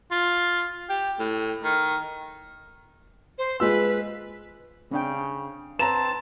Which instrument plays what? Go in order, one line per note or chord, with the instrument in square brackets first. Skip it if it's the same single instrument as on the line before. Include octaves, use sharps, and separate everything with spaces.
[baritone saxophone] F4
G4
A2
D#3
[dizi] C5
[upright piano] G#3 F4 E6 [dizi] B4
[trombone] C#3 [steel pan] C4 D4 G5
[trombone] C4 [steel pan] B4 C#5 [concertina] A5 [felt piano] A#5 E7